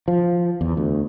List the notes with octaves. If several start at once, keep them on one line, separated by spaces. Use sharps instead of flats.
F3
E2
D2